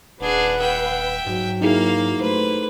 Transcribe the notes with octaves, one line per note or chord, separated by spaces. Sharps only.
D#1 D4 G#4 B4 F#5
E5 G5
G#2 F#3
A#3 D#4 E4 G#4 F5
A3 B4 C5